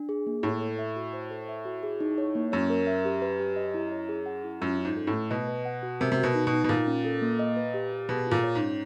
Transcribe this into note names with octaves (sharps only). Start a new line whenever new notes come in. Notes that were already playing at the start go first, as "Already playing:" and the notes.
Already playing: D4
G#4
A#3
A2 C#5
A4
E5
F#4
C5
A4
E5
F#4
G#4
D#4
C#5
A#3
F#2 C#5
A#4
E5
G4
B4
G4
D#5
E4
C#5
G#4
F#5
E4
F#2 F4
C#4
G#2
A4
A2
A3
B2 D#5
B4
F#5
F#4
C3 A#4
C3
F#4
B2
D#4
B2
D#4
B2
A#2 F4
C#4
A4
A#3
D#5
B4
G4
G4
B2 G#4
A#2 F4
C#5
G#2
C#4